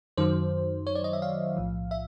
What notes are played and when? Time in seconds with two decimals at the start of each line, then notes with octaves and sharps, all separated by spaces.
0.17 F#2 D#3 F#3 C5
0.87 C#5
0.95 D5
1.04 D#5
1.13 E5
1.22 F5
1.57 B1 A2 F3
1.91 E5